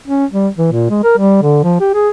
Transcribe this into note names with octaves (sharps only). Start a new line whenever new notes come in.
C#4
G3
E3
A#2
G#3
A#4
G3
D3
F3
G4
G#4